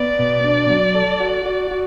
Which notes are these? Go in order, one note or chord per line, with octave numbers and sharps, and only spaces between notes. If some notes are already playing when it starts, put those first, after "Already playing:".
Already playing: B3 D5
B2
D4
F#3
A4
F#4
F#4
F#4